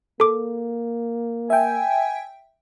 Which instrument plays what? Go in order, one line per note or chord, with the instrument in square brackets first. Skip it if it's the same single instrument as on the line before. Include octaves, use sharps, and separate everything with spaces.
[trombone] A#3 [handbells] A4 D6
[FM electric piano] E5 G5 [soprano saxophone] G#5